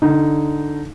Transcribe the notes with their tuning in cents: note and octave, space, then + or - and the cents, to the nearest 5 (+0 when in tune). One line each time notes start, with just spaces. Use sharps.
D3 +0 D#4 +0